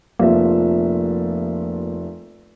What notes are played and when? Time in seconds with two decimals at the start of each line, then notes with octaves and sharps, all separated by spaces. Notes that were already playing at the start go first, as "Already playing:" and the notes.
0.19 F1 F3 A#3 E5